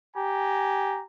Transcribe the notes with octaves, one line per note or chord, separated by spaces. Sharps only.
G4 G#5 A#5